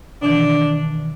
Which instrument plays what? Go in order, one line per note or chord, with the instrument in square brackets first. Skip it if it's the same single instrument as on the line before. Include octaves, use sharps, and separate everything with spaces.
[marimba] B2 D#3 E3 [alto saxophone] D4